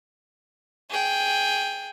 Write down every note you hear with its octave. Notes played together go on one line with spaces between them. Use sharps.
G#4 G5